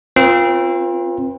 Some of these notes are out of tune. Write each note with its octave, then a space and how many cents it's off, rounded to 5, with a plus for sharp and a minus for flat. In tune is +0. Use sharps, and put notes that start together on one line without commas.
C4 +30 F4 +0 B4 -35